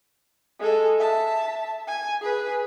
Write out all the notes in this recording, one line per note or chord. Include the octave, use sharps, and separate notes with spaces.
G#3 A4
E5 A5
G#5
G#4 B4